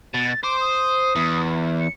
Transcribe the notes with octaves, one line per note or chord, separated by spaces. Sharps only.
B2 A6
C5 D6
D#6
E2
C#7